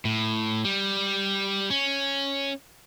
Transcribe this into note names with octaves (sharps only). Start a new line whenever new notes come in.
A2
G3
C#4